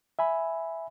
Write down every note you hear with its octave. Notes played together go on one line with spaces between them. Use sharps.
E5 G#5 B5